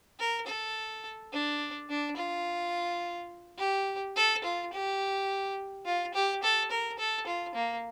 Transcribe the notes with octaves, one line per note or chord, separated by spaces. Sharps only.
A#4
A4
D4
D4
F4
G4
A4
F4
G4
F4
G4
A4
A#4
A4
F4
A#3